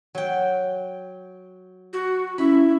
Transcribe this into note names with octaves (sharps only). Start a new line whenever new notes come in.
F#3 G5
F#4
C#4 E4 B5